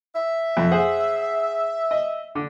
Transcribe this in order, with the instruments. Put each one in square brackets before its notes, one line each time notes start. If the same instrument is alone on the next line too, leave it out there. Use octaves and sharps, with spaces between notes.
[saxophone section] E5
[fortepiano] F2
G#4 C5 F#5
D#5
D3